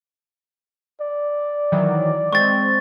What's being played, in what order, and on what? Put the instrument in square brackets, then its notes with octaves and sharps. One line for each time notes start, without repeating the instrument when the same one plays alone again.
[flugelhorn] D5
[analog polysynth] D#3 E3 F#3
[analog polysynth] G#3 C4 [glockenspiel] C#6 A6